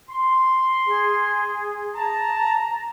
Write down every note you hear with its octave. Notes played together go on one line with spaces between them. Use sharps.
C6
G#4
A5 A#5